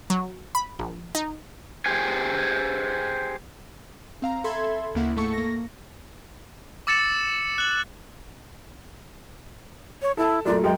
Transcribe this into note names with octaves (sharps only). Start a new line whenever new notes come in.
F#3
B5
A#1
D#4
G4 G#4 C5 G#5
C4 F5 A#5
A4 E5 B5 C6 G#6
D2 C#3 A#3 E4 F#5
G#2 A3 A4 C#6 C#7
A#3 A#6
D6 E6 A6 C#7 E7
F#6 F#7
C#5
E4 A4 A5
F#2 A#2 A3 D5
F#2 G#3 G5